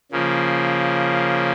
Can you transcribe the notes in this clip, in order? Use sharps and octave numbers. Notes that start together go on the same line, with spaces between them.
C#3 F3 A#3